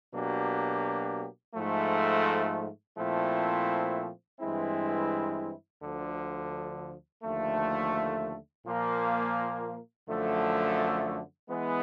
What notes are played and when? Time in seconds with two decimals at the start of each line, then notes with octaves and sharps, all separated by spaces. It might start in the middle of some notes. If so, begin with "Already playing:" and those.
0.13 B2 F#3 A#3 D4 G4
1.54 G#2 F3 A3
2.97 A#2 F3 A3 C4 E4
4.39 G2 E3 G#3 C4 E4
5.81 D2 D3 F3
7.23 D#2 D3 F3 A3
8.65 A#2 F3 A#3
10.07 F#2 D3 F3 A3
11.49 E3 G#3 B3